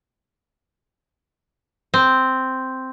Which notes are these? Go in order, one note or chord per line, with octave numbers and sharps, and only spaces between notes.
C4